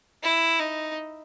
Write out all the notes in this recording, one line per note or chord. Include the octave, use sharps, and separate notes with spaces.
E4
D#4